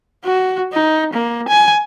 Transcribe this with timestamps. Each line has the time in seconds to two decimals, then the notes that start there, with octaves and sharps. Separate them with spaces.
0.24 F#4
0.72 D#4
1.13 A#3
1.49 G#5